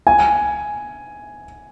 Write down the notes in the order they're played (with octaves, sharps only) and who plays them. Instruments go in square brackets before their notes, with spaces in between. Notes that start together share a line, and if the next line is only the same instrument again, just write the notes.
[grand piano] G#5